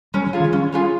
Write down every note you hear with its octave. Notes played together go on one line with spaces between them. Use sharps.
G3 C#4
F3
F4 G#4 C#5
D#3
G3 C#4
F4 G#4 C#5